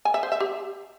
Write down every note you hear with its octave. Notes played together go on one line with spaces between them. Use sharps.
G#5
E5
C5
E5
G4